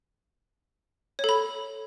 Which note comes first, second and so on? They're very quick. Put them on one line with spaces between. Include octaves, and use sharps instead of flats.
C#5 A4 B5